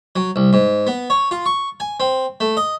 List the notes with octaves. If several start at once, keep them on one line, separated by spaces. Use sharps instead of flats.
F#3
C2
G#2
B3
C#5
F4
C#6
G#5
C4
A3
D#5